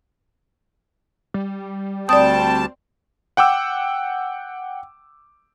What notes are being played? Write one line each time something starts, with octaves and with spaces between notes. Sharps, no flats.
G3
D2 G3 C4 D5 G5 A5 D#6
F#5 G5 D6 E6